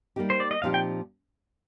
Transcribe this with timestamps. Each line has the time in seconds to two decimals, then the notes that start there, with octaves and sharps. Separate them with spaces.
0.16 G3 A#3 D#4 G4
0.30 C5
0.40 D5
0.51 D#5
0.62 A#2 F3 C4 D#4 G4 F5
0.74 G5